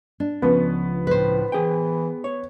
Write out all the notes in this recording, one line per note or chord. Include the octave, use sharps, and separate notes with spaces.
D4
C#2 F3 B3 C#4
A2 B4 C5
E3 G#4 G5
C#5